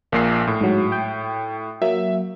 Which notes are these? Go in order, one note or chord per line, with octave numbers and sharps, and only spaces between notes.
A#1 A#2 A#3 C7
A2
G#2 F#3
G5
F#3 A#3 E5